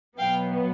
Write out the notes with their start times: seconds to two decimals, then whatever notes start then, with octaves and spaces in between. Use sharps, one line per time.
0.18 B2 F#3 B3 F5 G5